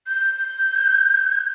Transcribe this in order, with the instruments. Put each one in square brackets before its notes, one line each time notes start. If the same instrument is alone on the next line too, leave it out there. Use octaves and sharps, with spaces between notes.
[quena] G6